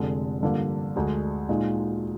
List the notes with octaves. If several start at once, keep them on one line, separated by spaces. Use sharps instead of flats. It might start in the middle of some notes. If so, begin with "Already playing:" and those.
Already playing: F1 F2 D3 G#3
G2 D3 F3 A#3
D2 D3 G#3
A#2 G#3 D#4